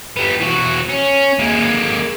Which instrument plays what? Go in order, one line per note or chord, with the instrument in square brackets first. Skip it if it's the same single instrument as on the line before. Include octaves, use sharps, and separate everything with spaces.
[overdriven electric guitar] G3 B3
E3 F#4
C#4
G#3 A#3